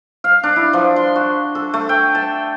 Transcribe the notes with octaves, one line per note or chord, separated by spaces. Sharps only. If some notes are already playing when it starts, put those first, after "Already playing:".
F5
D4
E4
F3
C6
F#4
A4
A3
G5
A5